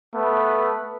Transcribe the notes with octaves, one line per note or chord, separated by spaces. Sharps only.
A3 B3 B4